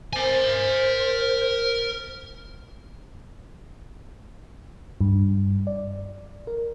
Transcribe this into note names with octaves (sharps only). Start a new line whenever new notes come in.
A#4 C5 G#5
G2
D5
A#4